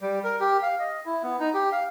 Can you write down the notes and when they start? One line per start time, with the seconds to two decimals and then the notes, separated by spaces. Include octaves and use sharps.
0.01 G3
0.24 A#4
0.40 G4
0.63 F5
0.79 D#5
1.06 E4
1.23 B3
1.40 D#4
1.54 G4
1.72 F5